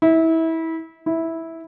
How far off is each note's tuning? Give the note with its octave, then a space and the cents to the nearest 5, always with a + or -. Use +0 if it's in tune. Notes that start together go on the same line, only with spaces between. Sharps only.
E4 -25
E4 -10